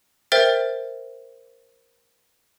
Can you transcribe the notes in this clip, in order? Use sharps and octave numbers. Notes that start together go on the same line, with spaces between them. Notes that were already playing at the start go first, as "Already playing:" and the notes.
A#4 C5 E5 G5 F6 A6